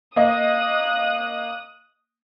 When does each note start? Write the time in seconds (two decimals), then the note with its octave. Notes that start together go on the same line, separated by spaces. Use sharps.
0.16 A#3 D#5 D#6 F#6